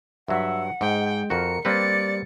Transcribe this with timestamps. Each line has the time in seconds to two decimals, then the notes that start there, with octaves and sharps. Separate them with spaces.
0.28 G2 F#3 E5 F#5
0.81 G#2 G#3 G5
1.30 F2 F#4 A#4 C#7
1.65 G3 A#3 C4 B4 D5 A6 C#7